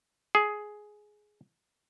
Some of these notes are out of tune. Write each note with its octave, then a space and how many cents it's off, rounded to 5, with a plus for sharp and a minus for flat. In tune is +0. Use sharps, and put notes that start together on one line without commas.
G#4 +10